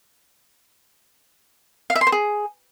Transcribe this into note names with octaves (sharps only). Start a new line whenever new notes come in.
F5
E5
C6
C5
G#4